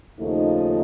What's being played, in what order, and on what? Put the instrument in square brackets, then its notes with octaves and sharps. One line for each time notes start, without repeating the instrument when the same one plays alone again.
[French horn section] D#2 C#3 F3 A3 D#4